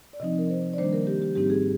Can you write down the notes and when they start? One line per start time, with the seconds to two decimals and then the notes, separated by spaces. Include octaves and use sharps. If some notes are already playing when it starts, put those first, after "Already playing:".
0.13 D5
0.20 C3 F3 C4 D#4 D#5
0.39 A#4
0.50 C5
0.74 D5
0.78 D#3 G3 A#3 D4 C5
0.93 A#4
1.07 G4
1.22 G4
1.35 G#2 G3 C4 D#4 G4
1.50 G#4